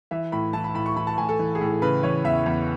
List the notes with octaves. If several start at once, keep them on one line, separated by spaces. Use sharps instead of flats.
E3 E5
A2 B5
E3 A5
B5
A2 B5
C#6
E3 B5
A5
A2 G#5
A4
E3
G#4
A2
A4
C#3 B4
E3 C#5
E2 E5
E2